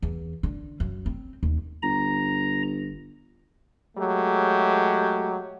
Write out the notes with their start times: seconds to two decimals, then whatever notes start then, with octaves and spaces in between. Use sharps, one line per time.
0.02 E2
0.43 D3
0.80 F#2
1.06 C4
1.43 D#2
1.82 G1 A#5
3.97 F#3 G#3 A3 G4